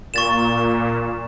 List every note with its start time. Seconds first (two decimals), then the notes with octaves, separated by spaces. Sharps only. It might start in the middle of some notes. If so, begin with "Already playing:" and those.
0.14 A#2 C#6 A6 E7